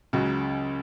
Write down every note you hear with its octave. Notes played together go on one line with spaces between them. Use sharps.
C#2 C#3 F#3